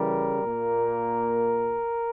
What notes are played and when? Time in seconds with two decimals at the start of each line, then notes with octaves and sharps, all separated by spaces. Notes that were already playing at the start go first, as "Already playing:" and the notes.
Already playing: C#3 E3 G3 A#4
0.44 A#2 A#3